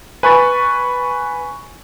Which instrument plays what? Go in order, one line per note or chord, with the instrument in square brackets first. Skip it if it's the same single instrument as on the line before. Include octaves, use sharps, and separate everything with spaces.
[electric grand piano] B4 A6 [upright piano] G#5 B5 C#6